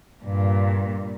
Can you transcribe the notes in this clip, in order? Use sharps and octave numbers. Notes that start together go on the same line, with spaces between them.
G2 A#2